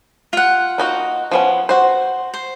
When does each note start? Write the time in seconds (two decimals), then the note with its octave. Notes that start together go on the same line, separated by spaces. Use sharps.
0.33 F4 F#5
0.78 A#3 D#4 F#4
1.31 F3 B3 C#4
1.69 F#4 C5
2.34 C5